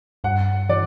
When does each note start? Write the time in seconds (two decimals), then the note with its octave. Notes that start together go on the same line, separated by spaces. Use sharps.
0.24 G2 F#5
0.69 E3 D5